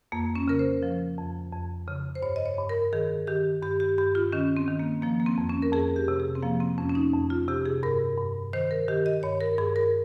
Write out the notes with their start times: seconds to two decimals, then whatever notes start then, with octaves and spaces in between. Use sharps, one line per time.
0.12 F2 A#3
0.35 C#4
0.48 C#3 A#4
0.59 C5
0.83 F3
1.18 F2
1.52 F2
1.88 C#3
2.15 C5
2.22 G2 C#5
2.36 D#5
2.46 C#5
2.58 G2
2.69 A#4
2.93 D#3 G#4
3.27 D#3 G4
3.63 G2 G4
3.80 G4
3.98 G2 G4
4.15 F4
4.32 D#3 C#4
4.57 C4
4.68 D#3
4.79 A#3
5.02 F3 A#3
5.20 A#3
5.26 C4
5.38 F2
5.49 C#4
5.62 A#4
5.73 F2 G#4
5.96 G4
6.08 C3
6.20 G#4
6.35 C4
6.43 F3 A#3
6.60 C4
6.78 F2 C#4
6.89 C#4
6.95 D#4
7.13 F2
7.30 F4
7.48 C3 G4
7.66 G#4
7.83 G2 A#4
8.18 G2
8.53 D#3 C5
8.71 A#4
8.88 D#3 G4
9.06 D#5
9.23 G2 C#5
9.41 A#4
9.58 G2 G#4
9.76 A#4